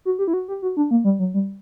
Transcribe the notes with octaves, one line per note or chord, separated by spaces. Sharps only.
F#4
G4
E4
F#4
G4
F#4
D4
A#3
G3
F#3
G3